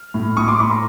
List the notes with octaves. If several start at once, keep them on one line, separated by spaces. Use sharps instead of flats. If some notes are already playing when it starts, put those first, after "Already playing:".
Already playing: F6
A2
A2 C#6 D#6
C6 D6
A2 B5 C#6
A#5 C6